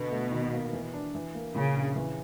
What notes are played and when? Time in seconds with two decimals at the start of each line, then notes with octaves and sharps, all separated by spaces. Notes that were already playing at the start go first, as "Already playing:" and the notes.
Already playing: B2 D3 B3
0.12 A3
0.31 D#3
0.53 A#3
0.73 E3
0.94 D4
1.15 E3
1.35 A#3
1.55 A#2 C#3
1.76 A#1
1.96 E3